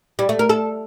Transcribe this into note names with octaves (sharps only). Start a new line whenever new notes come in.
G3
A3
A#4
A4